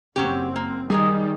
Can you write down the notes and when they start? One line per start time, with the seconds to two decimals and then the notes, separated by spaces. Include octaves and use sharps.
0.16 F#1 F#3 C4 C#4 G4
0.56 A#3
0.90 D#3 G3 G#3 D#4 G#4